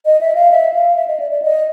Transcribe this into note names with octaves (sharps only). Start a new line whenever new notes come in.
D#5
E5
F5
E5
F5
E5
D#5
D5
D5
D#5